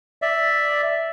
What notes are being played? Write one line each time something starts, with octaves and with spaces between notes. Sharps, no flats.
D5 E5